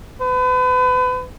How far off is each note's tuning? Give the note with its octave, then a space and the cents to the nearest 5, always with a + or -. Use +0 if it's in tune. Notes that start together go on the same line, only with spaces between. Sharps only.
B4 +35